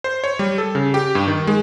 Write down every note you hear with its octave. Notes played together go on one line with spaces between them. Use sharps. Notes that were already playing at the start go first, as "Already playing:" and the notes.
C5
C#5
G3
A4
C#3
G4
G2
D#3
G#3